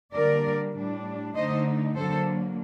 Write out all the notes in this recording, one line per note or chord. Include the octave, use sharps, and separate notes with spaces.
D3 G3 A#3 A#4 D5
A2 G3 D4
D3 A3 D#4 C5 D#5
D3 F#3 A#3 A4 C5